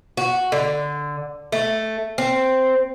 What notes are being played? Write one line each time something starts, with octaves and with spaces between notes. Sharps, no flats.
F#4
D3
A3
C4